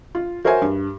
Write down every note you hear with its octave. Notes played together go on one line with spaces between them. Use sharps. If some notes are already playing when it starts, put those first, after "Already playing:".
F4
F#4 A#4 C5 C#5 E5 G#5
G2